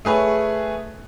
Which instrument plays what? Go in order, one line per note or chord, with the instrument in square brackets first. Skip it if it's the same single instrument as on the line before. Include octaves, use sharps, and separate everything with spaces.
[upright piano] A3 G#4 B4 C#5